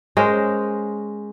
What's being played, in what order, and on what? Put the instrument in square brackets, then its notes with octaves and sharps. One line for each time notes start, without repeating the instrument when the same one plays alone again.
[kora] G#3 C#4 A#4 C5